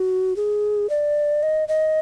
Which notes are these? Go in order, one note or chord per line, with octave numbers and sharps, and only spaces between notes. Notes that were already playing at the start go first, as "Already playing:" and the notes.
Already playing: F#4
G#4
D5
D#5
D#5